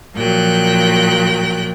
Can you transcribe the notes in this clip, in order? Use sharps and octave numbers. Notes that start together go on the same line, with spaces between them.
A#2 F3 F#3 G5 F#6